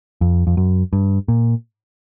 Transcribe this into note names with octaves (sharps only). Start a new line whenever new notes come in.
F2
F2
F#2
G2
A#2